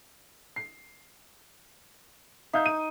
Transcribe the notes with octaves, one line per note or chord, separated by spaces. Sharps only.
C7
D#4 E5 F5 G6
D#7